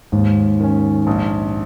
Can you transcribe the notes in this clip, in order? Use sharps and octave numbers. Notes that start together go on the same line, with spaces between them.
D#2 G#2
D#3 C#4
A#1